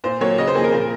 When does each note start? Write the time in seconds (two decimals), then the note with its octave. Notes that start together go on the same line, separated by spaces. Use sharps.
0.04 A#2 C5
0.21 F#3 A#3 C#5
0.38 C#3 D#5
0.47 C5
0.55 F3 A#3 G#4
0.64 A#4
0.72 A#2